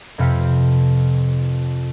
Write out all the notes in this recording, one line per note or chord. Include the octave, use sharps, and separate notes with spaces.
F2 C3 G4 B4 F5 C#7